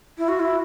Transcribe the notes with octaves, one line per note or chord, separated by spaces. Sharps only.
E4
F#4
E4